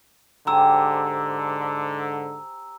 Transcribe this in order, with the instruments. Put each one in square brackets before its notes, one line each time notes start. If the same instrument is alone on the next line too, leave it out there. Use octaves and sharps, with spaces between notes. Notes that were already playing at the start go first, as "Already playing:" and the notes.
[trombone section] G#2 D3 [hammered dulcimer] G4 C5 G#5 [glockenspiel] A#5 E6